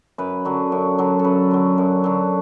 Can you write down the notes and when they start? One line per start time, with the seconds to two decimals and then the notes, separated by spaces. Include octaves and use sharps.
0.18 F#2 B4
0.45 D3 F#3
0.72 F#2
0.98 D3 F#3
1.19 A4
1.24 F#2 B4
1.51 D3 F#3
1.78 F#2
2.04 D3 F#3